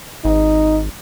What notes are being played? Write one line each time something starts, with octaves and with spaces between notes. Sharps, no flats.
G#1 D#4